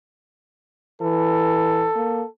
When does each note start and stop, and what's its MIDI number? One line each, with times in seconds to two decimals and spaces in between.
1.02 1.87 52
1.02 2.28 69
1.96 2.22 58